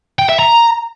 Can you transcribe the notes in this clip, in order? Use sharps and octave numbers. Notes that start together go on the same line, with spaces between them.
G5
E5
A#5